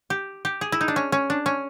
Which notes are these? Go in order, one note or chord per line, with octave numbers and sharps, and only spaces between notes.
G4
G4
G#4
E4
D#4
D4
C#4
C#4
D4
C#4